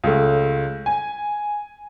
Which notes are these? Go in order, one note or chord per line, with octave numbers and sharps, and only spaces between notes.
C#2 A3
G#5